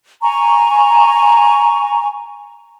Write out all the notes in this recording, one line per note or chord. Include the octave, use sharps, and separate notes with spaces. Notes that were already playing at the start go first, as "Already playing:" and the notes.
G#5 A#5 C#6